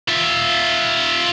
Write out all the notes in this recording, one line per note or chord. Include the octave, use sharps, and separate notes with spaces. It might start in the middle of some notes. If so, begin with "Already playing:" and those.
F4 E5